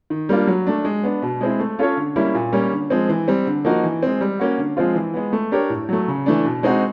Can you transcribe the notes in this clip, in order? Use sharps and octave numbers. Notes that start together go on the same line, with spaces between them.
D#3
G3 A#3 D4 F4
F#3
A3 D4
G#3
B3 D4
B2
G#3 C4 E4
A3
C#4 F4 A4 C#5
D3
G3 A#3 C#4 E4
A#2
G3 A#3 C#4
D3
F3 G#3 C4
E3
G3 C4
D3
F3 A#3 D#4 F#4
E3
G#3 C4
G3
A#3 C#4 F#4
D3
F3 G#3 C4 F4
E3
G#3 B3
A3
D4 G4 A#4 C#5
A2
F#3 A3
C#3
E3 A3 D4
B2
G#3 C4 D#4 F#4